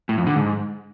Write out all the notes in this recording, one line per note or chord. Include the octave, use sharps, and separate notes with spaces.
A2
F2
D3
G#2